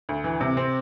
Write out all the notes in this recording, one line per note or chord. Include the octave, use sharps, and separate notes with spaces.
D2
E3
C3
C4